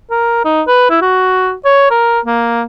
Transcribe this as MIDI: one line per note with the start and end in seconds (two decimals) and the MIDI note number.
0.11 0.45 70
0.45 0.62 63
0.67 0.87 71
0.90 0.98 64
1.01 1.53 66
1.65 1.88 73
1.91 2.20 70
2.26 2.63 58